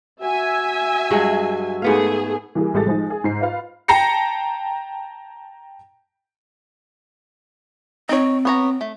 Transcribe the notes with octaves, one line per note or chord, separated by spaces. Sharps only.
F#4 E5 G#5
G2 F#3 G#3
G#2 A3 B3 G#4 F5
E3 G3 A#3 G#4
A1 G#3 G4 A4 A6
F3 G#3 D#4
G#4
G#2 C7
F4 B4 F5
G5 A5 A#5 A#6 C7 C#7
C4 D#4 C#5
B3 C#5 A#5
A3